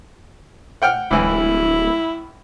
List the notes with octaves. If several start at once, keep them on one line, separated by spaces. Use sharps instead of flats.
F#5 G5 F6
D1 C#2 E3 E4